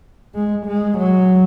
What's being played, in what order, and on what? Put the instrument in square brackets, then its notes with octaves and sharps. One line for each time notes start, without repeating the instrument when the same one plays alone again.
[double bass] G#3
G#3
F#3